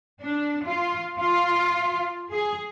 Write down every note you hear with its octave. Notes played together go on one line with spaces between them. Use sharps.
D4
F4
F4
G#4